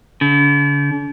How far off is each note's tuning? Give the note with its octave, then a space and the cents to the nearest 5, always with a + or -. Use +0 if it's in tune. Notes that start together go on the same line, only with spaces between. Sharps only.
D3 -45